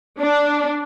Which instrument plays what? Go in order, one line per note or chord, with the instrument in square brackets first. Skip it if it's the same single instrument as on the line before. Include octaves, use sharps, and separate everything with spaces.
[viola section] D4